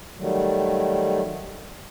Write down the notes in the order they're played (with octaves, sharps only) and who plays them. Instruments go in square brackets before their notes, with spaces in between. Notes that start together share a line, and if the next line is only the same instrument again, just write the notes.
[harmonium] D#3 F#3 G3 A3